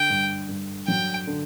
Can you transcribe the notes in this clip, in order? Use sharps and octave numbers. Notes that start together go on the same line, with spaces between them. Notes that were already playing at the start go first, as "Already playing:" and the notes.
Already playing: D3 G5
G2
G2
F#3 G5
D3